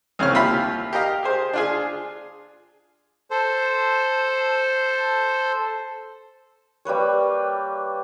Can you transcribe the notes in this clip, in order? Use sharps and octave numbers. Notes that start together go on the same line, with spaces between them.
C2 C#3 C4 C#5 F6
D#2 F4 G4 E5 B5
G4 A#4 D#5 F5
G4 G#4 C5
D4 F4 G#4
A4 C5
G3 A#3 B4 C#5